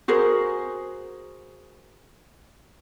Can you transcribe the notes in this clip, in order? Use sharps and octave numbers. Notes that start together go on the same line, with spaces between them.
F#4 G#4 A#4 C5